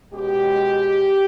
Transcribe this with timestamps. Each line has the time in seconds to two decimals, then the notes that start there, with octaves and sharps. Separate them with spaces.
0.12 B2 G#3 C#4 G4